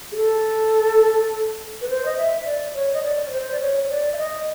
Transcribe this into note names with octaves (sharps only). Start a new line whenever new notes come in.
G#4
A4
B4
C5
D#5
E5
D5
C#5
D#5
D5
C#5
C5
D5
C#5
C#5
D5
E5
D#5